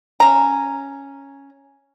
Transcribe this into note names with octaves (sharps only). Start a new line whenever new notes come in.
C#4 A#5